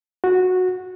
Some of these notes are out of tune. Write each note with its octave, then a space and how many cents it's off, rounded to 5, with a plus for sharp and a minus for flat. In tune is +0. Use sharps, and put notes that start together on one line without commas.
F#4 -10